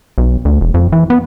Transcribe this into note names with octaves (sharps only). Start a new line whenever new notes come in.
B1
D2
E1
F2
E3
B3